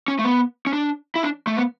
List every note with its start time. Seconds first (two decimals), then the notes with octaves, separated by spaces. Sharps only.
0.08 C#4
0.19 A3
0.25 B3
0.67 C#4
0.73 D4
1.16 E4
1.23 D4
1.47 A3
1.56 B3